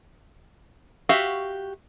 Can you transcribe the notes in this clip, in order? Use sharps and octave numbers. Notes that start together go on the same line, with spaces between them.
F#4 G4 E5 F5